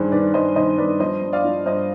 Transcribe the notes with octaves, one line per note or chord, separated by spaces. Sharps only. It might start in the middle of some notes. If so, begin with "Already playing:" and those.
Already playing: G2 D#3 G#4 C5
D#3 B4 D5
G2 C5 D#5
D#3 C5 D#5
G2 B4 D5
F3 C5 D#5
G2
D5 F5
F3
G2 C5 D#5